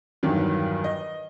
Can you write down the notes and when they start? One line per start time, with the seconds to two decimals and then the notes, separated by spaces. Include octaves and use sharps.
0.23 E2 G2 D#3 F#3
0.84 D#5